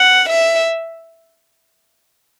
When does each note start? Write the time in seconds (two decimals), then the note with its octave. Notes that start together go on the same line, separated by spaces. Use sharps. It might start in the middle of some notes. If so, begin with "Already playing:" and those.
Already playing: F#5
0.29 E5